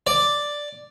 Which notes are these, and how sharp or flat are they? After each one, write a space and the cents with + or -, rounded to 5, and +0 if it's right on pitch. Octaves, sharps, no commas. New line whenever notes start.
D5 +0